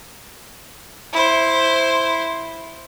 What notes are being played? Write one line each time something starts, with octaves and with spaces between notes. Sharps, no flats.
E4 C5